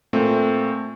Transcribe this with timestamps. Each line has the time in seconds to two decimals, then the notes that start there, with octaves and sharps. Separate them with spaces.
0.13 A#2 A3 C4